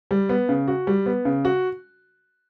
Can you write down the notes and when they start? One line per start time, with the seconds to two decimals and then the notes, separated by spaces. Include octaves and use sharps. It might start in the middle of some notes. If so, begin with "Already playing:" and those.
0.11 G3
0.29 B3
0.49 C#3
0.68 F#4
0.87 G3
1.06 B3
1.25 C#3
1.45 F#4